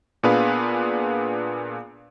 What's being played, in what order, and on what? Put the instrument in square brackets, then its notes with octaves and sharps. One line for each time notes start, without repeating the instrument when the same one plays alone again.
[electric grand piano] A#2 B3 D4 G#4 B4 F5